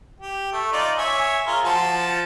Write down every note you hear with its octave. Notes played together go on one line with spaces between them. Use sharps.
G4
A3
D#4 F4 D5
C#5 E5 G#5
F4 G#4 A#4
F3 F#4 A5